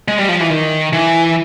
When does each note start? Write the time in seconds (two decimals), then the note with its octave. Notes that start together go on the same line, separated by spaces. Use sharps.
0.08 G#3
0.19 G3
0.29 F3
0.40 E3
0.50 D#3
0.93 E3